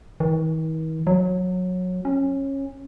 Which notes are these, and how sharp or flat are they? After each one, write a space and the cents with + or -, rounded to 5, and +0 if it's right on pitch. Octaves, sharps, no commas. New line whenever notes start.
D#3 +45
F#3 -20
C#4 -20